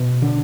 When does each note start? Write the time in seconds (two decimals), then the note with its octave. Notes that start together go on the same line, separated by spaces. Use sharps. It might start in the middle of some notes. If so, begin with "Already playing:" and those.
Already playing: B2
0.22 D3 D4